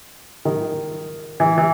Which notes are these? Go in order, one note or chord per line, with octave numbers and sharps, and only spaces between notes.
D#3
E3
E3